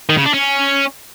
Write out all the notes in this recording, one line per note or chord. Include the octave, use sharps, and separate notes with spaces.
D#3
C#3
D4
C#4